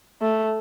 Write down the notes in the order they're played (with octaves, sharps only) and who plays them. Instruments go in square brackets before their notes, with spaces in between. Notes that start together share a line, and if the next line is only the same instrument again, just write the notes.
[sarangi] A3